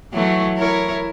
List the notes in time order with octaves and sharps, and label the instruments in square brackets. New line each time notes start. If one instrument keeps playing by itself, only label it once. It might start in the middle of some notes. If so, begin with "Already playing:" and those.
[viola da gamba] E3 F#3 A3
E4 A#4 C#5